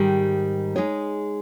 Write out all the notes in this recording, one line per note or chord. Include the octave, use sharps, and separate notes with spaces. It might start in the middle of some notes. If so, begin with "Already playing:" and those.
Already playing: G#2 D#3 G3
G#3 D#4 G#4 C#5